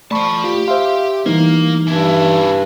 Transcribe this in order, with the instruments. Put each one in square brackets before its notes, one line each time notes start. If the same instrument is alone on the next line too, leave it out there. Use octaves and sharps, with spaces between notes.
[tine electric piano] A3 B5 C#6 [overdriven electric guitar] C5 A5 [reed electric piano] D5
[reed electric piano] F4 [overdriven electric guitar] G4
[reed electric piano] C5 E5 C6 [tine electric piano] F5
[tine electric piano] E3 D#4 [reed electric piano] G3 B3 [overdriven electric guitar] A#3
[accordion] G2 [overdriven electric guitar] C#3 E4